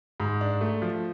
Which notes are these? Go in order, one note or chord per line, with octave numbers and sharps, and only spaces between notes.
G#2
D4
A3
F3